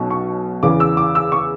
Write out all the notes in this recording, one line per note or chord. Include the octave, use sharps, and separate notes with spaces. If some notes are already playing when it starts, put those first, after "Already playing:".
Already playing: B1 B2 F#3 C#4
C#6
E2 C#3 E3 D6
E6
D6
E6
C#6